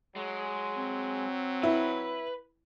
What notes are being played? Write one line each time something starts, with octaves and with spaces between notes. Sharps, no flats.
F#3 G#3
C4
E4 B4